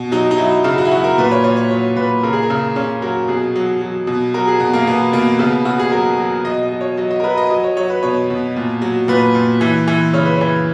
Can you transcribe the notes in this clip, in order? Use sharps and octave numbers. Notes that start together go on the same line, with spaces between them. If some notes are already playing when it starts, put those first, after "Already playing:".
Already playing: B2
F#3 D#4
D#4
F#3 E4
C#3 F#4
F#4
E4
F#3 F#4
A#4
A#2 B4
C#5
A#2 C#5
C#5
F#3 C#5
A#2 B4
C#3 A#4
G#4
A#4
C#3
C#3 C#4
F#3 A#4
B2 G#4
F#3
F#3
B2
F#3 A#4
G#4
B2 F#4
A#3
B2 B3
B2 A#3
C#3 B3
C#3 F#4
G#4
F#3 A#4
F#3
B2 D#5
D#5
F#3
C#5
F#3 D#5
D#5
A#4
F#3 B4
D#5
F#3 D#5
C#5
F#3 C#5
B4
B2 C#5
B2
A#2
F#3
A#2 B4
A#2
E3
E3
C#3 C#5
B4
E3 C#5